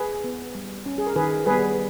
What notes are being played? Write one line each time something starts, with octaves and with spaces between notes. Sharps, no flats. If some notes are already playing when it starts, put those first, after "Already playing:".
Already playing: G#4 B4
B3
G3
C#4
G#4
A#4
D#3 G#4 B4
G3 B3 G#4 B4